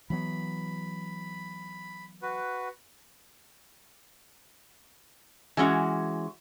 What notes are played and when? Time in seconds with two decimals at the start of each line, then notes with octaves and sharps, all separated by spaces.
0.10 E3 F#3 B3 B5
2.22 F#4 B4
5.57 E3 G#3 C#4 F#4